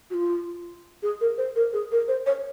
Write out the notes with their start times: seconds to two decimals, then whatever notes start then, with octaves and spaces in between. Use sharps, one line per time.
0.10 F#4
0.14 F4
1.03 G#4
1.21 A#4
1.38 C5
1.55 A#4
1.73 G#4
1.92 A#4
2.08 C5
2.26 C#5